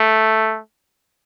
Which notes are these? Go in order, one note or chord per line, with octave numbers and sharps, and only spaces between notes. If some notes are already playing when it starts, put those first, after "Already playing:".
Already playing: A3